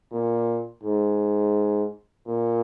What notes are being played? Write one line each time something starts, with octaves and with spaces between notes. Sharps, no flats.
A#2
G#2
A#2